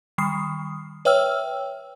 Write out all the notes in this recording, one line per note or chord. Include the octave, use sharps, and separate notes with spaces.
D#3 G3 D#6 C7
B4 C#5 E5 G5 E6 F6